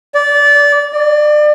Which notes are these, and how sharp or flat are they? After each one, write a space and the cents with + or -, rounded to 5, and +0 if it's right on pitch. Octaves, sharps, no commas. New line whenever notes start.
D5 -20
D5 +30